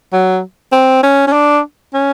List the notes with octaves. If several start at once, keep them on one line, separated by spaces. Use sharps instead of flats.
F#3
C4
C#4
C#4
D4
C#4